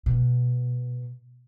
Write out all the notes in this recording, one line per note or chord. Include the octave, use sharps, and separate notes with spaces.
B2